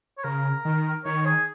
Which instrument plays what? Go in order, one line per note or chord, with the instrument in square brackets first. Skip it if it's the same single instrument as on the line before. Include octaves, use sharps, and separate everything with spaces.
[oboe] C#5
[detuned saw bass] C#3 [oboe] A#4
[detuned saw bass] D#3
[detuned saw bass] D#3 [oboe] C#5
[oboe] G#4